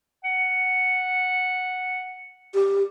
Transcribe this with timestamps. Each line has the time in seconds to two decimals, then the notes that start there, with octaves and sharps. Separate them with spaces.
0.24 F#5
2.54 G4